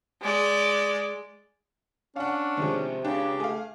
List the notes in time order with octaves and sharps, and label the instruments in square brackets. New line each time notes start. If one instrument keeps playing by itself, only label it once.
[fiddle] G#3 D5
[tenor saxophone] C#4 [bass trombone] D4 [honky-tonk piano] F5 F#5
[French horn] C3 [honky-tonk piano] D#3 F3 G#3
[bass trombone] C#2 [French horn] C#3 [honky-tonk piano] D4 [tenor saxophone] G4
[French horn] A3 [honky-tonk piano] G#4 F5